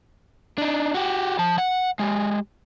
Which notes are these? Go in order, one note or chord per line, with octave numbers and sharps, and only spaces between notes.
D4 D#4
F#4 G4
F3 A5
F#5
G#3 G4